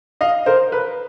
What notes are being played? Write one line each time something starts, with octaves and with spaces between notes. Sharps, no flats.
D#5 F5
A#4 C5
B4